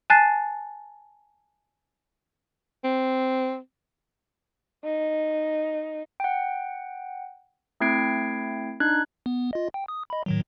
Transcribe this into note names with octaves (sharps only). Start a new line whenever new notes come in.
G#5 A5 F#6 A6 C7
C4
D#4
F#5 G5
A3 C4 E4 G#6 C7 D7
D4 D#4 F#6 G#6
B3
F4 D#5
G5
D#6
D#5 B5
A2 D#3 F#3